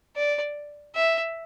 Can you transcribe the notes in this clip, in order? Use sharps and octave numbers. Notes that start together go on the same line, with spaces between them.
D5
E5